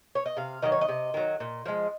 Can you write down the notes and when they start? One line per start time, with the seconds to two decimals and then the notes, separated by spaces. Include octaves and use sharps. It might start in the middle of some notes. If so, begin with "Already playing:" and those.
0.15 C#5
0.26 D#5
0.37 C3 F5
0.62 D#3 F#3 D#5
0.72 C#5
0.81 D#5
0.89 C3
1.14 D#3 F#3
1.40 A#2
1.66 F3 G#3